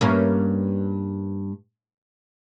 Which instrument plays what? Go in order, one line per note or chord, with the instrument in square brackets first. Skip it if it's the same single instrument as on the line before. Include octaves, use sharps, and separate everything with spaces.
[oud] G2 A#3 C#4